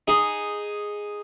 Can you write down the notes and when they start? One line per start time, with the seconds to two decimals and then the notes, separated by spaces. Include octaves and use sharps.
0.08 D#4 G#4